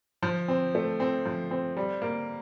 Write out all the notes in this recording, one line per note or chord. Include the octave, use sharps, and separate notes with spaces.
F3
C4
A3
C4
F3
C4
G3
A#3